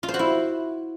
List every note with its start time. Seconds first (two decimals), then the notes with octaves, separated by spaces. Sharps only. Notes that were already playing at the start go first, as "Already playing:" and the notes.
0.03 F4
0.08 C5
0.14 F#4
0.19 E4